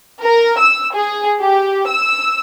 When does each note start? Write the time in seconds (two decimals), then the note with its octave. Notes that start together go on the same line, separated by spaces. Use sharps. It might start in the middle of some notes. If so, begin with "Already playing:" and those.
0.23 A#4
0.59 E6
0.94 G#4
1.40 G4
1.88 E6